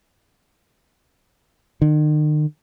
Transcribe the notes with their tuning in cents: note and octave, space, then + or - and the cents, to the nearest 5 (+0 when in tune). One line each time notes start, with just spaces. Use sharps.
D#3 -45